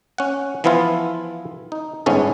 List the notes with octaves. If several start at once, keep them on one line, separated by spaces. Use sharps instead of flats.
C#4 F#5
E3 F3 B3 E4 F4
D#4
G1 G#2 B3 C#4 A4